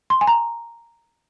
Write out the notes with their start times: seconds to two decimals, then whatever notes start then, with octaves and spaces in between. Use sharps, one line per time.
0.10 C6
0.21 G#5
0.27 A#5